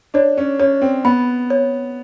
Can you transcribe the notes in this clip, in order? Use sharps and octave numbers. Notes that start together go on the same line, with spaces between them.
D4 C#5
C#4
C#4 C#5
C4
B3 B5
C#5